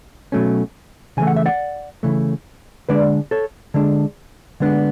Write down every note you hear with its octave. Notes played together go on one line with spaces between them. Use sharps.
B2 F#3 A3 C#4
C#3 E3 A3 G#5
F#5
E5
D5 F#5
C#3 E3 A3
D3 G#3 D4 B4 D5
A4 C#5
D3 G#3 D4
D3 G#3 B3 D4